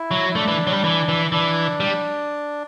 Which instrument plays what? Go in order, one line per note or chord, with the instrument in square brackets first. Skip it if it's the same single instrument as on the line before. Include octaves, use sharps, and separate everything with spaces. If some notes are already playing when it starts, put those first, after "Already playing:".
Already playing: [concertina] E4
[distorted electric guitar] F#3
[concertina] E4
[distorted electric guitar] A3 [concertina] D4
[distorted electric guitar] E3
F#3
G3
E3
E3
[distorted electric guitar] E3 [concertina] D4
[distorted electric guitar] G3